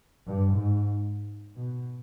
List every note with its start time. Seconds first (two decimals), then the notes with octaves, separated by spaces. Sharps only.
0.25 G2
0.56 G#2
1.55 B2